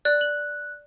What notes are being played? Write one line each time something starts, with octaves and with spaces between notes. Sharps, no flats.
D5 F#6
F#7